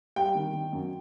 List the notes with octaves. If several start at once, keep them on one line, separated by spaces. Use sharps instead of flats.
G3 G5
D#3
D#3
F#2